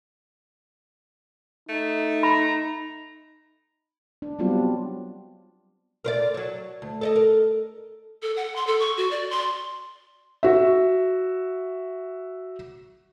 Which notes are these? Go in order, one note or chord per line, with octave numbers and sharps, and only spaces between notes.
A3 D#4
A#5 B5
D4
F#3 G3 B3 C4 D4 F4
A#4 C5 D5
F#3 C#5
D2
A4 D5 D#5
A#4
A4
F#5
C6
A4
C#6
F#4
D5
C6
F#4 E5